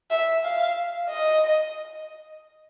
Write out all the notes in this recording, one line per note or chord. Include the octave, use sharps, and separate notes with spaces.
E5
F5
D#5